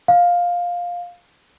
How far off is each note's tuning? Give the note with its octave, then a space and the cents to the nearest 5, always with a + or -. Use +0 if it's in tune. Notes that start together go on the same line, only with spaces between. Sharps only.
F5 +10